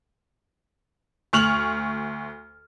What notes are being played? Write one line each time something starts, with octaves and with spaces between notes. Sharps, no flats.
D2 C#6 F6 F7 F#7